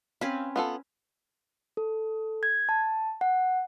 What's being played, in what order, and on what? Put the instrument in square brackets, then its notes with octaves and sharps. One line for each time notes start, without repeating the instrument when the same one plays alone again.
[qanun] C4 C#4 B4 [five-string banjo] F5
[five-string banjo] B3 F4 A4
[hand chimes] A4
G#6
A5
F#5